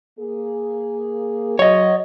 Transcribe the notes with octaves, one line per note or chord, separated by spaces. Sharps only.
A#3 G#4
F#3 C#5 D#5